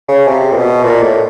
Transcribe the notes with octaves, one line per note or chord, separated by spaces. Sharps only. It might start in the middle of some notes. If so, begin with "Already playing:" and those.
C#3
C3
A#2
B2
A#2
A2